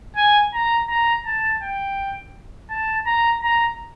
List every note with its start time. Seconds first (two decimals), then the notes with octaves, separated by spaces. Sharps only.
0.17 G#5
0.54 A#5
0.89 A#5
1.26 A5
1.62 G5
2.70 A5
3.06 A#5
3.42 A#5